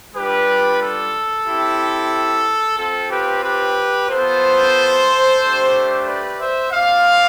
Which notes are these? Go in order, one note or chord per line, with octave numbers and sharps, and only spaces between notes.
G3 D4 F4 G4 B4
A4
C4 E4 G4
C4 F4 A4
G4 B4
G4 B4
B3 F4 A4 C5
A3 D4 G4
B4 D5
C5 E5
C4 F4 D5 F5